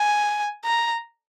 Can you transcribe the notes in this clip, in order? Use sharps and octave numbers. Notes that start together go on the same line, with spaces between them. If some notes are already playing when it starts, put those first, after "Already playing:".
Already playing: G#5
A#5